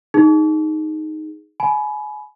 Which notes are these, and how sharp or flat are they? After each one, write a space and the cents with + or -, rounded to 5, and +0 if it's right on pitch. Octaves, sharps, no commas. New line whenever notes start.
D#4 +0 G#4 +0
G#5 +30 B5 +0